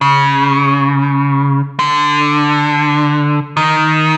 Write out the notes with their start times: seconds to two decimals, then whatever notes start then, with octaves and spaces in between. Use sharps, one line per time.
0.01 C#3
1.79 D3
3.57 D#3